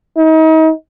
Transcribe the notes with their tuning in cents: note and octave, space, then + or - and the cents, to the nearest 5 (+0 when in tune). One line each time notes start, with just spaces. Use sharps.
D#4 +35